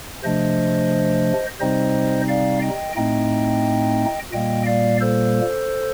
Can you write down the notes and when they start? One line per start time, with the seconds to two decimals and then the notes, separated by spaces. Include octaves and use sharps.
0.24 C3 F3 A3 D4 C5 D#5
1.60 C3 G3 C4 D#4 C5 D#5
2.28 D5 F5
2.62 D#5 G5
2.96 A2 A3 C4 D#4 D#5 G5
4.32 A#2 G3 A#3 D#5 G5
4.66 D5 F5
5.01 A4 C5